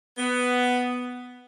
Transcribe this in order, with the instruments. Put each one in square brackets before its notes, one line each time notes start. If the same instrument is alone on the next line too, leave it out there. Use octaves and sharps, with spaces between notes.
[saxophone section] B3